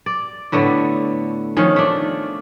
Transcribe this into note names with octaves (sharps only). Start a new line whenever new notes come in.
D5
A2 D3 A3 B3
D#3 F3 C#4
A3 D4